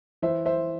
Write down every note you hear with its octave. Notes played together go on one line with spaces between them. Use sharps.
E3 C5 E5
C5 E5